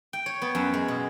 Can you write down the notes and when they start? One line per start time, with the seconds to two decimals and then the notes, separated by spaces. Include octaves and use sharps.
0.13 G5
0.26 C#5
0.42 B3
0.55 F#2
0.74 G#3
0.88 B2